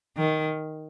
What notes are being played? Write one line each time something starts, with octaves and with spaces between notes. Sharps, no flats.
D#3